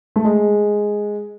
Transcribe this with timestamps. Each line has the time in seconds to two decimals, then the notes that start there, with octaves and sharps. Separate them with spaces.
0.16 A3
0.25 G#3